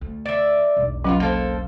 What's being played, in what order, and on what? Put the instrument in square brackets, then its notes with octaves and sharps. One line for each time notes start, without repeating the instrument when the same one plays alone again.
[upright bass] D2
[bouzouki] D5 E5
[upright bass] E1 B1
[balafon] F#3 C#4 [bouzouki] F4 F#4 B4
[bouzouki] A#3 A4 C5